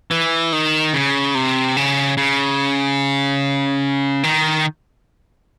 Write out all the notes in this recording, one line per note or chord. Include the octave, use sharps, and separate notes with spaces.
E3
D#3
C#3
C3
C#3
C#3
D#3